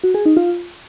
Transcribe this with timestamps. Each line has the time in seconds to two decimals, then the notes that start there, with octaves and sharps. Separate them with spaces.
0.04 F#4
0.15 G#4
0.26 D#4
0.37 F4